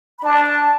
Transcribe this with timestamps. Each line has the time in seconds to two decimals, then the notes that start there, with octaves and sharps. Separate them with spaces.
0.19 B5
0.23 D4 A5
0.47 A5